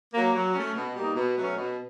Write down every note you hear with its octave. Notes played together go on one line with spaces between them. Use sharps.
F#3 A#3
F#3
A3 C#4
B2
G3 A#3 D#4
B2
F#3 A3 C#4
B2